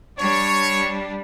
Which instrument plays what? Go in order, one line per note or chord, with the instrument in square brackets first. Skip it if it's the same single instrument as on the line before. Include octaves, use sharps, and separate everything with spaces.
[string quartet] G3 D4 [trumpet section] C#5